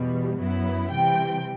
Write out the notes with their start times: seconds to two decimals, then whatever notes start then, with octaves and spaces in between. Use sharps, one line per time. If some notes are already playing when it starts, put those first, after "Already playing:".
Already playing: E2 B2 G3
0.40 F#2 F#3 B3 E4
0.92 C3 E3 G3 G5